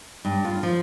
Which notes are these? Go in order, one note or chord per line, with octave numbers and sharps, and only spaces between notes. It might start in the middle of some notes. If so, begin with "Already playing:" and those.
G2
F4
F3